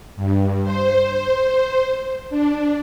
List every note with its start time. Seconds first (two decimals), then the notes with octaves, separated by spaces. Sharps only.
0.16 G2
0.63 C5
2.30 D4